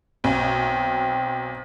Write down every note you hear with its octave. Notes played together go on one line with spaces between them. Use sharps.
B1 C4